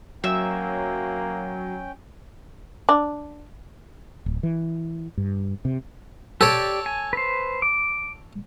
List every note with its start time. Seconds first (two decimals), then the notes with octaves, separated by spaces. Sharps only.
0.24 F#3 A#3 C#4 E5 G5 E6
2.89 D4
4.26 D1
4.43 E3
5.17 G2
5.65 C3
6.41 G4 A4 C#5 D5
6.86 G#5
7.13 B4 C5
7.62 D6